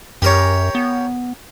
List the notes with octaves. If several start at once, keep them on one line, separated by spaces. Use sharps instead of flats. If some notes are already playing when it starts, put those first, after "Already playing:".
F#2 G4 A#4 C#5
B3